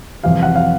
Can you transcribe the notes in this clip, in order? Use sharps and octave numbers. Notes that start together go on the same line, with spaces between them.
F2 C3 E3 G3 F5
F#5
F5